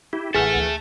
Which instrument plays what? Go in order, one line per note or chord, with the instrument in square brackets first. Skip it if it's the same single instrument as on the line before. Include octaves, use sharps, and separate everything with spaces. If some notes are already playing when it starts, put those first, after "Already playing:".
[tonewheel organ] E4 G4
[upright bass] A1 [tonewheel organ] E3 F#5 [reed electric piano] G#4 F6 [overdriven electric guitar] A4 E5
[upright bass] D2